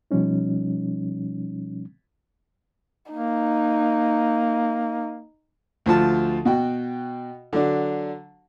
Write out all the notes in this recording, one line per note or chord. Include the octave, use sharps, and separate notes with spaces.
B2 F3 G3 C#4 D#4
A#3 D#4
D2 F3 F4 A5
B2 F#4 G5
D3 F#3 D4